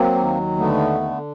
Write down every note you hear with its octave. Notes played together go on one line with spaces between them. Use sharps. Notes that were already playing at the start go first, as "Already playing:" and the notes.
Already playing: F#3 A#3 C4
D#2
D3 A3 B3
D3